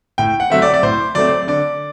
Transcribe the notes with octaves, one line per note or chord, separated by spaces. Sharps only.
A2 G5
F#5
F#3 A3 C4 E5
D5
D5
A2 C5
F#3 A3 C4 D5
D3 D5